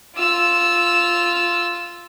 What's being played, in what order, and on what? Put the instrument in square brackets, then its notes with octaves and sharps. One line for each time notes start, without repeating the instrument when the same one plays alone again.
[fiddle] F4 E6